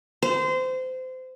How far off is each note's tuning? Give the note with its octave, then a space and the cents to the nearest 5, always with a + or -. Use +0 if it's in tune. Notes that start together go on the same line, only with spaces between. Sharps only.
C5 -25